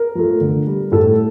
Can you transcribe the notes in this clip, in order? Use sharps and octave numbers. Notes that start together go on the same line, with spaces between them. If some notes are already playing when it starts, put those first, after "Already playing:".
Already playing: A#4
F3 A3
D3
G3
A2 A4